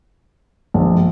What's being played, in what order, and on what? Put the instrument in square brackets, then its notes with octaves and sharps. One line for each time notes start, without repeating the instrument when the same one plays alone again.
[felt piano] A#1